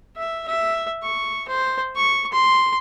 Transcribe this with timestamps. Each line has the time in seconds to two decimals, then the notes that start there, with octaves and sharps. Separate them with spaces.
0.16 E5
0.48 E5
1.03 C#6
1.48 C5
1.96 C#6
2.32 C6